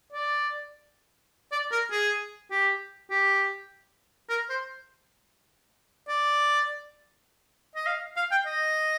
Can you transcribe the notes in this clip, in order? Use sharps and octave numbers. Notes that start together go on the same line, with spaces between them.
D5
D5
A#4
G#4
G4
G4
A#4
C5
D5
D#5
F5
F5
G5
D#5